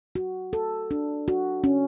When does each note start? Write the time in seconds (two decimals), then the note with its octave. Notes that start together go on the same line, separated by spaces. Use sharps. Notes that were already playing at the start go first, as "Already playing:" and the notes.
0.15 F#4
0.53 A4
0.91 D4
1.28 F#4
1.64 C#4